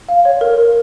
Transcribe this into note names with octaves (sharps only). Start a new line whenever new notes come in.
F5
C#5
A#4
A#4